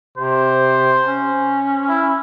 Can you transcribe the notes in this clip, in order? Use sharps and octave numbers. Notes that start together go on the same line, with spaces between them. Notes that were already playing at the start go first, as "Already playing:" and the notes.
C3 C5
C#4
E4